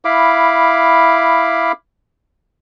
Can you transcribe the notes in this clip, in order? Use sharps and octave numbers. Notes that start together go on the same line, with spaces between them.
E4 F5 B5 D6